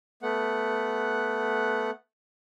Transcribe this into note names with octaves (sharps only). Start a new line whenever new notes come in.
A3 B3 F#5